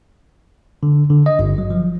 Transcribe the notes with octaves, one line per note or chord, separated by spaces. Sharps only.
D3
D3
D#5
G1
F#3
F3